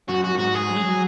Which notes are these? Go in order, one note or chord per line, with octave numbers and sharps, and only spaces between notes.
F#2 F#4
F#4
F#2
G#2 F#4
G#4
F#3
G#3
F#3